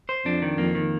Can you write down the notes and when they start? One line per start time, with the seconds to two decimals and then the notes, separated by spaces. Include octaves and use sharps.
0.09 C5
0.25 F2 D4
0.42 D#3
0.58 F2 A#3
0.75 D#3